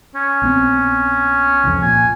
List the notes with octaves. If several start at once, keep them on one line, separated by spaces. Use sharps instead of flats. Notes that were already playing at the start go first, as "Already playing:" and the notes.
C#4
A#1 B3 C4
C2 F2
A#2 G#5